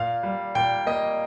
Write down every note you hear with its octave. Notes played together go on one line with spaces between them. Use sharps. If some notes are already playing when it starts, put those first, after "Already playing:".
Already playing: A#2 F5
G3
A#2 G5
A#3 D#5